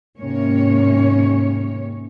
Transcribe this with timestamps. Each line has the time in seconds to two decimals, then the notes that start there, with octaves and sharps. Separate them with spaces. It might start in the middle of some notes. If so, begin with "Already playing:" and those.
0.18 D#2 G#2 C3 A#3 C#4 C#5